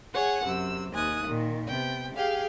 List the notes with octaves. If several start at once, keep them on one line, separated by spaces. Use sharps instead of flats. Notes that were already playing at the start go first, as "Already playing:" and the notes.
G#4 C#5 F#5 G#5
F#2 C3 E6
D#2 G#5 D#6 F#6
A#2 D#3
C3 B3 G5
G4 G#4 F5 G5